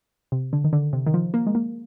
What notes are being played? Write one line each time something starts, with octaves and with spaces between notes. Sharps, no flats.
C3
D3
D#3
D3
C3
D#3
F3
A#3
G#3
A#3